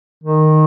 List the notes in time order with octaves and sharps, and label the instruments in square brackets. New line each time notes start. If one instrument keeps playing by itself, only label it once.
[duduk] D#3